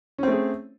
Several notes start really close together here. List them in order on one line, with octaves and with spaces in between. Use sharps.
C#4 C4 A3 G#4